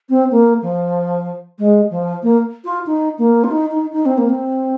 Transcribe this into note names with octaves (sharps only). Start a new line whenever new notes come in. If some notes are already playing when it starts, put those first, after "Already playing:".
C4
A#3
F3
G#3
F3
A#3
F4
D#4
A#3
F4
D#4
D#4
D#4
C4
A#3
C4